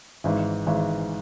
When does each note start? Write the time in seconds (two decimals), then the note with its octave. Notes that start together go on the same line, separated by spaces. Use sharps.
0.24 G#1 G#2 E3
0.67 G#1 G#2 E3